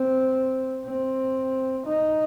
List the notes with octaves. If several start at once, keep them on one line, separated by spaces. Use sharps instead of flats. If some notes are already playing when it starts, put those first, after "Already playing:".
Already playing: C4
C4
D#4